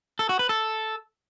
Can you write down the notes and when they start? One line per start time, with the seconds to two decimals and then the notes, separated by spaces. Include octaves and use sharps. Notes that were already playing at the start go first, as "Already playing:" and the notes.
0.19 A4
0.29 F#4
0.39 B4
0.49 A4